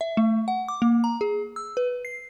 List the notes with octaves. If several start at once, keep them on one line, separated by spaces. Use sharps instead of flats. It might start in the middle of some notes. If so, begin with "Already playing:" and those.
E5
A3
F#5
D6
A#3
A#5
G#4
E6
B4
C7